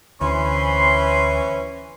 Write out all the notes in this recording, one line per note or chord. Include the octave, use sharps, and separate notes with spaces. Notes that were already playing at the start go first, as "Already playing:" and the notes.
D2 E3 C#4 C5 B5 C6